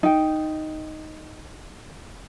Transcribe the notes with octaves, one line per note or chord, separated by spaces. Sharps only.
D#4 G5